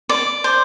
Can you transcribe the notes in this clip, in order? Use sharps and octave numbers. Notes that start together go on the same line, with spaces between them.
D5
C5